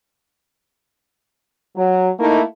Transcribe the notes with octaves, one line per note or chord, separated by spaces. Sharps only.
F#3
A3 A#3 D#4 E4